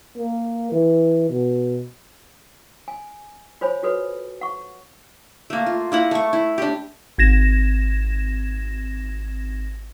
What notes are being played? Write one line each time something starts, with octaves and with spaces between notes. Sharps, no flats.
A#3
E3
B2
G#5
F4 C5 C#5 G#5 B5
F4 F#4 A4 B4 C#5
F#5 C#6
A3 A#3
F4
A#3 E4 F#5
A3 C#6
E4
D4 G4
G#1 G#6 A#6 E7